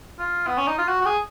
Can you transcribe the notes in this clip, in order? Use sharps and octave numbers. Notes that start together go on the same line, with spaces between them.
F4
B3
C#4
D#4
F4
F#4
F#4
G#4